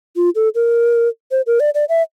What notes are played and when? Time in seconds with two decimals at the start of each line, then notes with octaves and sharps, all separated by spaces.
0.16 F4
0.35 A4
0.55 A#4
1.31 C5
1.47 A#4
1.60 D5
1.75 D5
1.89 E5